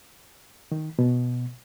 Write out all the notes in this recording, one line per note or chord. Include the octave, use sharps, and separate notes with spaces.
D#3
B2